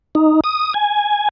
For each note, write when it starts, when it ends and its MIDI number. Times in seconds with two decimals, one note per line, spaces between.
0.15 0.40 63
0.44 0.73 87
0.74 1.29 80